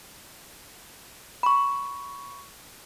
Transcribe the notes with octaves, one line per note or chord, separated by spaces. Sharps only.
B5 C#6